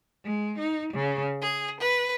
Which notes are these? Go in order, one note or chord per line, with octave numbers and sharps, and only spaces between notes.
G#3
D#4
C#3
G#4
B4